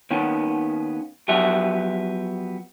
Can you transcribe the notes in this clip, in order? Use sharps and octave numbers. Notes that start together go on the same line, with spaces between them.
D#2 D#3 B3 C#4
F3 F#3 B3 G4 E5